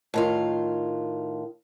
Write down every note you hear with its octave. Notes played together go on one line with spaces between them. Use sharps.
A2 D#3 F4